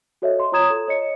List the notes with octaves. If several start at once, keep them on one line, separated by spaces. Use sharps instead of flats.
F#4 A4 C#5 D#5 E5
C6
F4 C#5 A#5 D#6 G#6 E7
A4
C#5 D#5 C#7